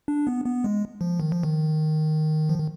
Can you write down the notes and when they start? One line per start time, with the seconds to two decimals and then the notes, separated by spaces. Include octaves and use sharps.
0.08 D4
0.27 B3
0.46 B3
0.64 G#3
1.01 F3
1.20 D#3
1.32 F3
1.43 D#3
2.49 F3
2.59 D#3